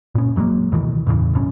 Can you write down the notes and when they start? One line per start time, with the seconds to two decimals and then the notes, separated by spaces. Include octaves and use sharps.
0.15 A#2 C#4
0.36 F#1 F#3 G#3 A#3
0.72 D2 B2 D#3 E3
1.06 E2 A2 C#3 E3
1.33 F#1 B1 C#4